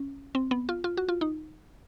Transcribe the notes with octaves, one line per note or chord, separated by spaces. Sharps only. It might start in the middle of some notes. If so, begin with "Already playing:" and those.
Already playing: C#4
C4
B3
F4
F4
F#4
F4
D#4